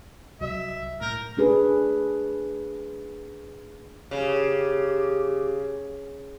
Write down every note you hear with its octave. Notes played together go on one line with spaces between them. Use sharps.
C2 F#3 D#5 E5
A2 A#4 G6
A3 D4 G#4 B4
C#3 G4